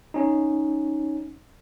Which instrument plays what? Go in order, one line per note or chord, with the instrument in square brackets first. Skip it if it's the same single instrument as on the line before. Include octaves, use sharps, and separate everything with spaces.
[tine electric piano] C#4 D#4